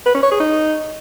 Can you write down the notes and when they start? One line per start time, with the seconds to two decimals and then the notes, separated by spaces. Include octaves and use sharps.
0.06 B4
0.14 C#4
0.23 C#5
0.31 G#4
0.40 D#4